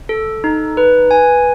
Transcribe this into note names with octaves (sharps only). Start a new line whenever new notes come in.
A4
D#4
B4
G#5